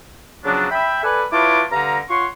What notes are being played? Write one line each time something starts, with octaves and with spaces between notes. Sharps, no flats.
C#3 F3 F#3 B3 D4
E5 G5 B5
A4 B4 D5 F#5 G#5
E4 F4 B4 C#5 A5 D6
G2 D3 F5 A#5
F4 C#5 F#5 C6 C#6